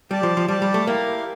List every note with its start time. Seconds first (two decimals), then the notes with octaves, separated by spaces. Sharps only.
0.11 G3 G4 D5 A5
0.23 F3
0.37 F3
0.48 G3 G4 D5 A5
0.62 G3
0.74 A3
0.86 A#3 E4 G4 A#4 F5